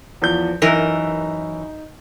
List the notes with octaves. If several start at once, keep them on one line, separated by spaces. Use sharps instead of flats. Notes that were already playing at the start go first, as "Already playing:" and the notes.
E2 F3 G6
F#2 E3 D#4 A#4